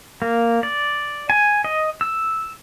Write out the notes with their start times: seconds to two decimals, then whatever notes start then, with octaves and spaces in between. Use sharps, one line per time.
0.22 A#3
0.63 D5
1.30 G#5
1.65 D#5
2.01 E6